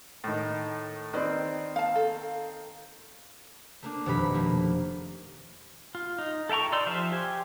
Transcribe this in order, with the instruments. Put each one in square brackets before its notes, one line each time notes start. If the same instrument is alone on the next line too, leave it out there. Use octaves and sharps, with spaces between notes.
[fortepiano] A2 D#3
[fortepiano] D#3 C4 [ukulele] B4 D5
[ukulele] F5 A5
A4
[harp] A3 A#3 D4
F1 B2 D#3 G4 B5
A3 A#3
[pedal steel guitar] F4
D#4
A4 E5 G5 A#5 C#6
D#4 D5 C6 E6 G6
F3 G4 C5 E5 F5
G4 G#5